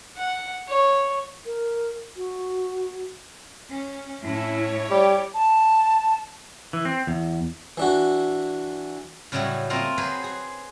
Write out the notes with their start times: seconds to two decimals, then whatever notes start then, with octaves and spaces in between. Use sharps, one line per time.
0.17 F#5
0.68 C#5
1.46 A#4
2.17 F#4
3.70 C#4
4.22 A2 A3 C#4 E4
4.57 C#5
4.90 G3 G4 D5
5.34 A5
6.73 E3
6.85 C4
7.07 E2
7.77 E3 D4 F#4
9.32 A2 C#3 F#3 G3 A3 F#4
9.70 A3 A#3 C4 F4 D#5
9.97 F#3 G#4 B4 C5
10.24 G#4